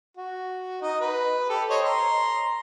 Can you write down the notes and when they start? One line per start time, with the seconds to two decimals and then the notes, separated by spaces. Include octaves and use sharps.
0.17 F#4
0.82 D#4 D#5
1.00 B4
1.50 G4 A4
1.70 C5 C#5 D#5
1.85 A#5 C6